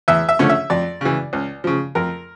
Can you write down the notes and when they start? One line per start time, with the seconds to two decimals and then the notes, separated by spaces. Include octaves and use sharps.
0.08 E2 E5
0.29 E5
0.39 D3 F3 A3 C#4
0.49 E5
0.70 F2 D5
1.01 C#3 E3
1.33 C#2
1.64 C#3 F3
1.95 F2 A#4